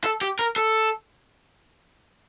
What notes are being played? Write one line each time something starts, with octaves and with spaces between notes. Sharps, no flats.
A4
G4
A#4
A4